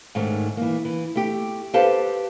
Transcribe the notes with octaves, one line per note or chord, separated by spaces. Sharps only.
G#2 D#3 A3 C#4
E3 A#3
E3
A3 G4
G4 A4 B4 C5 F5 A5